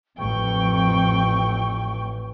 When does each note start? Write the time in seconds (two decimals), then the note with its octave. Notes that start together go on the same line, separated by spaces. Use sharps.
0.19 A1 F2 G5 C#6